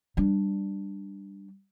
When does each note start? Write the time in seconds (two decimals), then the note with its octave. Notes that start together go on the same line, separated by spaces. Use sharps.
0.17 G3 D4